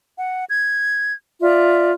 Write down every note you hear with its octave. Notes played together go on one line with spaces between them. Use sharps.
F#5
G#6
F4 D5 E5